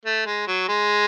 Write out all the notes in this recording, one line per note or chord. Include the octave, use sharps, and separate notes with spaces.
A3
G#3
F#3
G#3